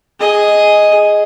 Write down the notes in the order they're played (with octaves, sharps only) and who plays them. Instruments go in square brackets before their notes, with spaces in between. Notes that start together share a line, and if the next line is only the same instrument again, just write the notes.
[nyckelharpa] G#4 D#5